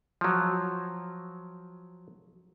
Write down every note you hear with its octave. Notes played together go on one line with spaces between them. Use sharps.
F3 F#3